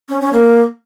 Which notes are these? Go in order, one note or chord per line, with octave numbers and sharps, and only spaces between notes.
C#4
C#4
A#3